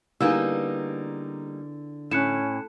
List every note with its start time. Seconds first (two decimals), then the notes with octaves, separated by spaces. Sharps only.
0.21 D3 G3 A#3 B3 D#4 E4 G#4 E6
2.11 A2 C#4 F#6 C#7 E7